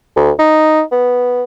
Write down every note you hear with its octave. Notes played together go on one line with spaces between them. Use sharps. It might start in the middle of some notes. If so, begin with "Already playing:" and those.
D2
D#4
B3